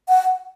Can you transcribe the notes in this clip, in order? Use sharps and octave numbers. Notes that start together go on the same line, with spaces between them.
F#5